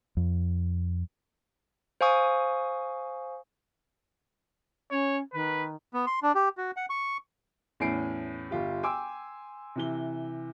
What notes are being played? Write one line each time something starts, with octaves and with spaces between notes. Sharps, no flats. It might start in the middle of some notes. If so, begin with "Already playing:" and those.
F2
C5 F5 G#5 C#6 D#6
C#4 C#5
D#3 B4
B3
C6
D4
G4
F#4
F#5
C#6
E2 A2 C#4 C7 D7
G1 F4 G4
G5 G#5 C6 D6 E6
C3 E3 G7